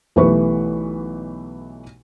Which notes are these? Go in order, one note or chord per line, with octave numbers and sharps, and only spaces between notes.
B1 E3 A3 G4 B4 C#6